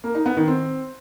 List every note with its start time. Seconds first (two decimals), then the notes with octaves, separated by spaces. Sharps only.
0.04 A#3
0.15 D#4
0.26 B3
0.37 D#3
0.48 C4